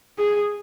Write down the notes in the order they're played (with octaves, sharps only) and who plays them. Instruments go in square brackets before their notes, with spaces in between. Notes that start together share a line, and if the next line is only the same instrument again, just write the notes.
[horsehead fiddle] G#4